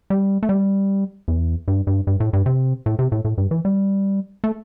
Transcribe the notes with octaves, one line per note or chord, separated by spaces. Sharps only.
G3
A3
G3
E2
G2
G2
G2
A2
G2
C3
A2
C3
A2
A2
G2
E3
G3
A3